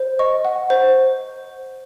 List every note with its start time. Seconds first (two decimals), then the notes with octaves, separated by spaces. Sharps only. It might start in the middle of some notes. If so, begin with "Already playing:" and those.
Already playing: C5
0.19 D#5 C#6
0.45 F#5
0.70 C5